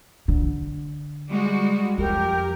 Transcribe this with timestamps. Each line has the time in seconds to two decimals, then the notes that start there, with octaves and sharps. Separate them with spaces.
0.28 D3
1.29 G3 G#3 F#4
1.98 F2 G4 A#4